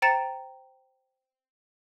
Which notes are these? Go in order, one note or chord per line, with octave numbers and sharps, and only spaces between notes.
C5 G5 A#5 A6 C#7 E7